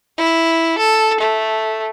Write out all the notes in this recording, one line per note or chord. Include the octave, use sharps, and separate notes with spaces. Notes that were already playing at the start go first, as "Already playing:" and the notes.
E4
A4
A3